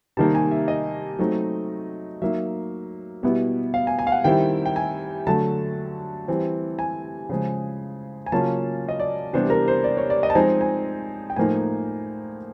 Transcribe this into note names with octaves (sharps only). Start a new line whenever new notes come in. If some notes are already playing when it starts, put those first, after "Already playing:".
C3 D#3 G3 A#3 D#4 A5
G#5
E5
D#5
F#3 A3 C4 D#4
F#3 A#3 D#4 E5
B2 G3 B3 E4
F5
G#5
G#5
F5
F#5
D#3 G3 C4 E4 G5
G5
G#5
D3 F#3 A3 A5
E3 G3 C4
G#5
C#3 F3 G#3
G#5
C#3 F#3 A#3 C#4 F4 A5
D#5
D5
C3 E3 G3 B3 D4 C5
A#4
C5
D5
C#5
D5
D#5
A5
F3 G#3 C4 D#4 G#5
G#5
G5
A2 F3 A#3 D#4 G#5